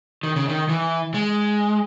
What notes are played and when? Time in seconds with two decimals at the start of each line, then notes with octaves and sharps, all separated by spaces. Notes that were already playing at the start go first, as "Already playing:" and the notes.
0.23 D#3
0.36 C#3
0.49 D#3
0.69 E3
1.14 G#3